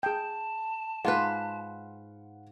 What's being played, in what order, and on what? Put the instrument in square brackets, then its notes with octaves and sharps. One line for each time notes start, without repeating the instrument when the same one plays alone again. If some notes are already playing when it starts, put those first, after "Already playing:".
[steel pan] G#4 G5 [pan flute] A5
[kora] G#2 F4 B4 [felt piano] F5 F#5